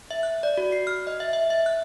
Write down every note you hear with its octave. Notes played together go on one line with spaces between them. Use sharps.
E5
F#6
D5
F#4
C7
F6
D#5
E5
E5
E5
F#6